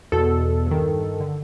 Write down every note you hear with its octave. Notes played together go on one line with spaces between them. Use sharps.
E2 B2 A4
G2 D#3
D3